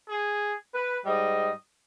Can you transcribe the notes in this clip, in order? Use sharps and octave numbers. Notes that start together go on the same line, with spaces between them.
G#4
B4
G#2 G3 D#5